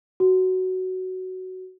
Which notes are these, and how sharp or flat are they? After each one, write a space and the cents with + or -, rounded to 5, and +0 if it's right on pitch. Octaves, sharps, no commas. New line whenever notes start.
F#4 +10